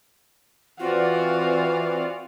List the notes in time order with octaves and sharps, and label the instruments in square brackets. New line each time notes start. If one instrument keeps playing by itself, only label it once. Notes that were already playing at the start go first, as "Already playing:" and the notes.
[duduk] E3 [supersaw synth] C4 D5 [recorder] F4 [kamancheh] F#4 F5